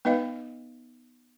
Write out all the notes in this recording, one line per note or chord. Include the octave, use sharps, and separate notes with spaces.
B3 D#4 B4 D#5 F5 G5